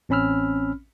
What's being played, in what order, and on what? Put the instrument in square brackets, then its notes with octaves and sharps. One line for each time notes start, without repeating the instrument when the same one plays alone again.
[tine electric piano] A1 C4 C#4 B5 E6 F6